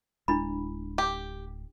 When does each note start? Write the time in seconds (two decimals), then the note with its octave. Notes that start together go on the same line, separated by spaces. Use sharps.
0.28 D1 G#3 D4 E4 B5
0.98 G4